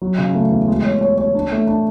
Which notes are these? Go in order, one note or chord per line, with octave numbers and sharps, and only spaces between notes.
F#3
C#3
A3
E2
G#3
C#5
C#5
C#5
D4
A3
D4